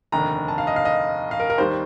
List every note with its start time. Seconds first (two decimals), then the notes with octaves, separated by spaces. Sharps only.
0.12 F1 D#2 D3 A#5
0.48 A5
0.58 F5
0.67 D#5
0.76 F5
0.85 D#5
1.31 F5
1.40 A#4
1.50 A#4
1.58 D#2 D#3 G3 C5